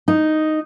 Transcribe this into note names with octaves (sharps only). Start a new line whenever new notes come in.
D#4